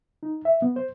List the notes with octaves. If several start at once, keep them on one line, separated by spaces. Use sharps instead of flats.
D#4
E5
B3
C5